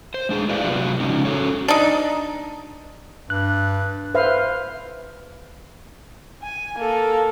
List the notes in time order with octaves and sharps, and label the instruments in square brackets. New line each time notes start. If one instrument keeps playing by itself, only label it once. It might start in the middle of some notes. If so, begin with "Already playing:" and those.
[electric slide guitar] C5
G#3 D4 G4 G#4
E4 B4 D5 E5 F5
C3 F#3 B3 F4 F#4 B4
C#3 F3 G#3 C#4 D#4
C#4 F#4 A4 C#5
[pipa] D4 D#4
[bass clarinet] G2 [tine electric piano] F#6
[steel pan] B4 C5 E5 F5
[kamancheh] G#5
A#3 A4